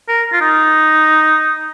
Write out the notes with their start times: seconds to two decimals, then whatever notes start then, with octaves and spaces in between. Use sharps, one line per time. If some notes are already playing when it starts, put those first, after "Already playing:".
0.08 A#4
0.33 F4
0.41 D#4